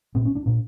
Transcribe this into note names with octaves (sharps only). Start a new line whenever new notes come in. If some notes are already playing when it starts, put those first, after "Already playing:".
A#2 C4
C#4
D4
A#2 D4